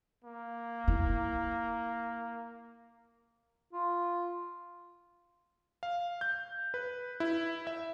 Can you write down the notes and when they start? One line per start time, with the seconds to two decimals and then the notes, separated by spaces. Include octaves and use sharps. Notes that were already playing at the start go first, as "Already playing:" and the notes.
0.25 A#3
0.88 E4
3.73 F4
5.83 F5
6.21 G6
6.74 B4
7.20 E4
7.67 E5